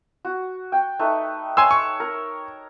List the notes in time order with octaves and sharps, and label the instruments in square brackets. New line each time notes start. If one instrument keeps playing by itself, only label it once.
[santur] F#4
G5
A3 D#4 B4
[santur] C#5 [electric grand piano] G#5 C6 E6
[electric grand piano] C#6
[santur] A#4